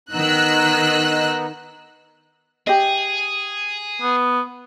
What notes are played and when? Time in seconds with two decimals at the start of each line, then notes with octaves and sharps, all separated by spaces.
0.13 D#3 B3 D#4 D#5 E6 F#6
2.67 G4 G#4 D#5
4.02 B3